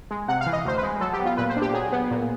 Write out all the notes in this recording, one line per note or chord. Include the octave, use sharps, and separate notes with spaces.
G#3
C3 F#5
F5
E3
D#5
D2 C5
B4
G#3
F#3 A4
G4
B3
F4
A#2 B4
C5
D4
G4
F#3 G#4
B3
A#2